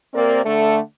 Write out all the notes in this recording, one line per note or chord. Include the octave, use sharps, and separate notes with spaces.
C3 A#3 C4 A#4 D5
D3 A3